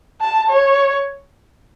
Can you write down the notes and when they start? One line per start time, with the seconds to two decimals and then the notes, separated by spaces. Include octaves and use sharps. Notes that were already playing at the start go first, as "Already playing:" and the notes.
0.21 A5
0.49 C#5